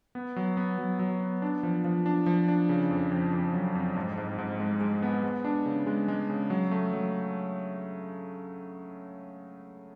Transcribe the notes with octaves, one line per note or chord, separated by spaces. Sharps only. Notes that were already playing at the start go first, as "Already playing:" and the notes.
B3
F#3
B3
F#3
F#3
B3
D4
F3
F3
D4
F3
D4
C#3
F2
F2
F2
F#3
F2
G#2
G#2
G#2
G#3
G#3
B3
G#3
D4
C#3
G#3
G#3
C#3
F#3
A3
F#3